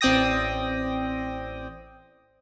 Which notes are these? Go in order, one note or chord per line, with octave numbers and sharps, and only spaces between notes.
A1 C4 D5 G5 D#6 A#6